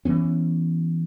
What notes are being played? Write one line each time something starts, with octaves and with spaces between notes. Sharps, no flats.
E3 F#3 B3 C#4